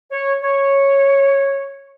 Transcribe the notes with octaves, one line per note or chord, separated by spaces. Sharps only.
C#5
C#5